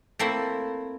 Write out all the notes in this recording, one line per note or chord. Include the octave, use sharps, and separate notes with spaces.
A3 A#3 C4 E4